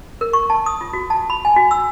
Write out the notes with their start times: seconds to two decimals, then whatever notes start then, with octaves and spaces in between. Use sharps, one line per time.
0.21 A#4
0.33 C#6
0.50 A5
0.66 D#6
0.81 F4
0.93 F#4
1.10 A5
1.30 B5
1.45 G#5
1.56 F#4
1.71 E6